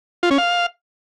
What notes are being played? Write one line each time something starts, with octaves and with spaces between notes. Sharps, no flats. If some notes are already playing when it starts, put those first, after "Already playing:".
F4
C#4
F5